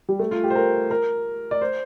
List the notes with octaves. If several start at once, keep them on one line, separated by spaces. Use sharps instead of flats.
G3
A3
F4
G4
C5
A#4
A#4
D5
C5